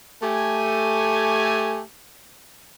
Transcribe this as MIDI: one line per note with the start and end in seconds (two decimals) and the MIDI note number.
0.23 1.80 57
0.23 1.80 67
0.23 1.80 80